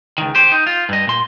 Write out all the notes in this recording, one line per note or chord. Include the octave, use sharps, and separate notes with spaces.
C#2 D#3
G4 C5
D#4
F4
G2 D#5
A#2 C6